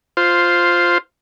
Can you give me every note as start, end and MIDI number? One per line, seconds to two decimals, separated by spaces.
0.17 0.98 65
0.17 0.98 72